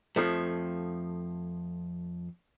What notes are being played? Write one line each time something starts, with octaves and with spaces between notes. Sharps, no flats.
F2 F3 A3